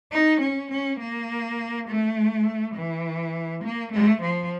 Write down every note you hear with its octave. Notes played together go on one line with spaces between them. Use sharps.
D#4
C#4
C#4
A#3
A3
E3
A#3
A3
F3